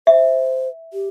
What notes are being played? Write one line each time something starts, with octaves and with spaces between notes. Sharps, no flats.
C5 E5
G4